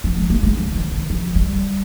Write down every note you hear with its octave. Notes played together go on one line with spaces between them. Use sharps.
F3
G#3
A#3
G#3
F3
D#3
D#3
F3
G3